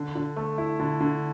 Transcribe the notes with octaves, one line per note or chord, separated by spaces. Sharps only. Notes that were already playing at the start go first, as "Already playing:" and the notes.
Already playing: D3
D3
A3
E4
D3
D3